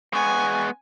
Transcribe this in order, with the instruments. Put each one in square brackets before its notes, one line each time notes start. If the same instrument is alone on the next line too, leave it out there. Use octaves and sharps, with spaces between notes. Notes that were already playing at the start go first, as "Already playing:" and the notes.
[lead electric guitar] G#3 B3 [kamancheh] G#5 [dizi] C#6